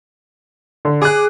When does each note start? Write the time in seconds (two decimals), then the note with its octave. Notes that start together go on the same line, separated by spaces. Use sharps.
0.85 D3
1.02 G#4 D6 F#6